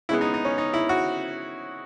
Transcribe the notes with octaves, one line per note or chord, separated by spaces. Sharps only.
C#3 G#3 B3 E4
D#4
D#4
C#4
D#4
E4
F#4